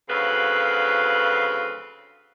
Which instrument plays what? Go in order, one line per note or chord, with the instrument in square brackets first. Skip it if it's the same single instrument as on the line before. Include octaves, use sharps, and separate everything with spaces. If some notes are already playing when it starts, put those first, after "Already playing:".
[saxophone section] D2 C#3 F#3 C4 B4 F5